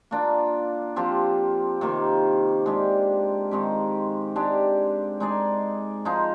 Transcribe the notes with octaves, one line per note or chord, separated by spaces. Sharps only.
A#3 D4 F4
F3 C4 G4 C5
C3 D#3 A#3 F4
G#3 D4 G4
D#3 G#3 C4 G4
G#3 D4 G4
G#3 D#4 G#4 D5
F3 G#3 D#4 G#4